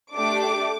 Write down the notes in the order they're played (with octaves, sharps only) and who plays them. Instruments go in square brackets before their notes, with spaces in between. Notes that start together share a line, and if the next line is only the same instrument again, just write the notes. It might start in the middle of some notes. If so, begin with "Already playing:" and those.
[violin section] A3 D4 G4 D6